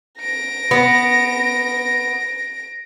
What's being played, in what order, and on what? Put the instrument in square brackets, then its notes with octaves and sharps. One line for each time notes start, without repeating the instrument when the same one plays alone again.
[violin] A#6 D7
[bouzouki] B3